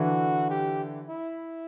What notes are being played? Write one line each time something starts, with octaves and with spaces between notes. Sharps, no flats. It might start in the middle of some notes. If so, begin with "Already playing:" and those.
Already playing: D3 E3 F#4
G4
E4